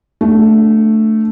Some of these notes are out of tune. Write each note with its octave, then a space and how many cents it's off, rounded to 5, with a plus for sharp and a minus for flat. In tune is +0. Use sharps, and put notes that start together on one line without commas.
A3 +0 D4 +0